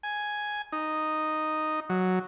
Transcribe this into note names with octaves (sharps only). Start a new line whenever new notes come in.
G#5
D#4
F#3